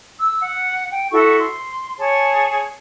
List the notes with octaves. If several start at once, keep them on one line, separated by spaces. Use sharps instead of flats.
E6
F#5
G5
E4 F#4 A4 C#6
C6
G#4 C#5 A5